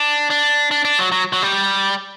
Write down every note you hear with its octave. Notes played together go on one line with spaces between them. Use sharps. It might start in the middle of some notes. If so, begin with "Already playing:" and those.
Already playing: D4
D4
D4
D4
F#3
F#3
F#3
G3